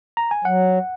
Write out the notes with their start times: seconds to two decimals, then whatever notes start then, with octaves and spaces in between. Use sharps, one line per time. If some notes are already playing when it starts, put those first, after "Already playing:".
0.17 A#5
0.31 G#5
0.45 F#3 F#5